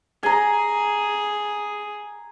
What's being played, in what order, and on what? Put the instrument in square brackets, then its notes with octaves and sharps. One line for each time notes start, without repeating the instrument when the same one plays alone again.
[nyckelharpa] G#4 [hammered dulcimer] G#5 A#5